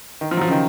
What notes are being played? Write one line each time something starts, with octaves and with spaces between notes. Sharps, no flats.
D#3
F3
F#3
F3
C#3
D#3